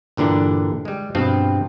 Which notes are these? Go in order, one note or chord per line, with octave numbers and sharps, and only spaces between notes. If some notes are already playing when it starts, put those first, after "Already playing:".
G2 A#2 D3 E3 D4
G3 G#3
G2 B2 F3 C4 F4